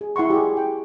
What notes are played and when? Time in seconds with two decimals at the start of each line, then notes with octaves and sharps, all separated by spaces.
0.01 G#4
0.16 E4 F#5 C6 C#6
0.30 G4 G#4
0.57 G5